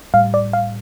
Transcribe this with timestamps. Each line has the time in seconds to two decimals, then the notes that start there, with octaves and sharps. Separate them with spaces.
0.14 A2 G3 F5
0.34 D5
0.53 F5